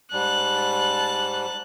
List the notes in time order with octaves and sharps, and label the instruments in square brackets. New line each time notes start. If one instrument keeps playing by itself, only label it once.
[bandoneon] G#2 G3 [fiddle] A5 F#6